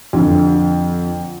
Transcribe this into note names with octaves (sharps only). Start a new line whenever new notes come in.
F2 D3